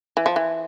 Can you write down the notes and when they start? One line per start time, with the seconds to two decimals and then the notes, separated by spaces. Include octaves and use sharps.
0.17 E3
0.26 F3
0.36 E3